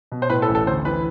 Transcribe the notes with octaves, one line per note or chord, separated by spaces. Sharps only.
B2
C5
A2 B4
A4
A1
A4
D2 C5
E3 B4